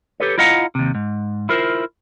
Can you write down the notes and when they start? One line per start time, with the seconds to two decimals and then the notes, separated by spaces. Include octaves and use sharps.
0.20 G4 A4 B4 C#5
0.38 E4 F4 D#5 F5 F#5 A#5
0.75 D#2 C3
0.95 G#2
1.49 E4 F4 A#4 C5